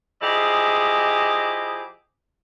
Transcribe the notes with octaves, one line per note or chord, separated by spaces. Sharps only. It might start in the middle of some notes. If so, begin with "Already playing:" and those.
F3 E4 G4 G#4 D#5